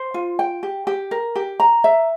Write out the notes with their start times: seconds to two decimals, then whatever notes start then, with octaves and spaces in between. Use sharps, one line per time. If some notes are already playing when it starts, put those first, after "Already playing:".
Already playing: C5
0.14 F4
0.39 G5
0.63 G4
0.87 G4
1.11 A#4
1.36 G4
1.60 A#5
1.84 E5